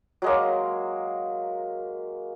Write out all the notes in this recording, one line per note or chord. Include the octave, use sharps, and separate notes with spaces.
F#3 G#3 A#3